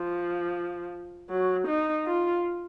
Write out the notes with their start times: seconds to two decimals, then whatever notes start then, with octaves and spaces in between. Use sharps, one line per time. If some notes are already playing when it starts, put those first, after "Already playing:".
Already playing: F3
1.30 F#3
1.67 D#4
2.06 F4